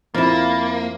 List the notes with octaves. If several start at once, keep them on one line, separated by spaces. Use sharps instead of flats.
F2 F3 A#3 E4 E5 B5 F6 A6